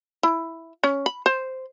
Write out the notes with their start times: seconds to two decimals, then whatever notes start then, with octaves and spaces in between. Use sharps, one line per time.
0.23 E4
0.84 C#4
1.06 B5
1.26 C5